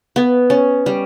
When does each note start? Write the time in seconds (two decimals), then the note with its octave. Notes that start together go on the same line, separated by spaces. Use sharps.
0.16 B3
0.50 C#4
0.86 G3